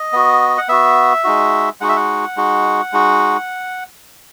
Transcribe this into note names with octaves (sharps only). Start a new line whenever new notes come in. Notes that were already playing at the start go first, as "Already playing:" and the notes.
Already playing: D#5
B3 F#4
F#5
B3 F#4 E5
G#3 D#4 F#4
G#3 D#4 F#4 F#5
E5
F#5
G#3 D#4 F#4
G#3 D#4 F#4